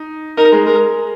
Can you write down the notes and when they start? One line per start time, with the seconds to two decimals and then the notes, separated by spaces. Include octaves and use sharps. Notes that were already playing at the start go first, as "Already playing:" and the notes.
Already playing: D#4
0.37 D#4 A#4
0.52 G#3
0.66 G#3 A#4